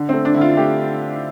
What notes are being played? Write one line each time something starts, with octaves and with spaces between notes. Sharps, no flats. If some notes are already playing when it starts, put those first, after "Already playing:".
Already playing: D3
C4
A3
D4
D3 E4
F4
A3 G4